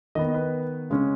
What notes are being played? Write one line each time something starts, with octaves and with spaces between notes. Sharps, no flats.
D#3 B3 D#5
B4
C#3 G#3 C#4